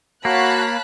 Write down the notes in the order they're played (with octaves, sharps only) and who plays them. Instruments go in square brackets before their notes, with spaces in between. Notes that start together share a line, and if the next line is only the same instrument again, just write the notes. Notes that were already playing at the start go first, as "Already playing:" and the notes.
[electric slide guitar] A#3 [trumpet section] F#4 [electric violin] C#5 F5 [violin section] A5 B5 F#6